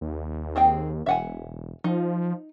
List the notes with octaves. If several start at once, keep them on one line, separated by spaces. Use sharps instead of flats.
D#2
C4 G#4 G5
E1 E5 F#5 G#5
F3 D#4